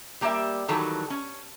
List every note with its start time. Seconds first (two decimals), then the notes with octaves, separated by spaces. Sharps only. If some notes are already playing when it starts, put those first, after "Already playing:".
0.21 G3 A#3 G4 D5 E5
0.68 D#3 E3 F#3 G3 F#4 A4
1.10 C#4